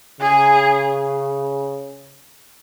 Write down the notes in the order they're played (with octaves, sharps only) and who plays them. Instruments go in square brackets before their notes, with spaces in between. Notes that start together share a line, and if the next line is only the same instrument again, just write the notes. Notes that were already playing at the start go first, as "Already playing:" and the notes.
[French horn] C#3 [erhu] G#4